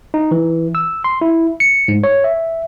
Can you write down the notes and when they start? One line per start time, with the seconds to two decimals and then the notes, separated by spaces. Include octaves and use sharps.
0.14 D#4
0.31 E3
0.75 E6
1.04 C6
1.21 E4
1.60 C#7
1.88 G#2
2.04 C#5
2.24 E5